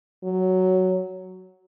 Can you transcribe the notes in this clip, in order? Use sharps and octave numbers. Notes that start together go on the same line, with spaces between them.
F#3